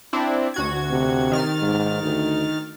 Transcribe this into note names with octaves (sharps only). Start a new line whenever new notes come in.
C4 D4 E4
D2 F#4 G#6
C3
D#3 F6 A6
G#2
D2